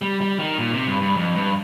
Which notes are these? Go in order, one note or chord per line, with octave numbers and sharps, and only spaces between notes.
G3
G3
D#3
A#2
C3
G2
G2
F2
G2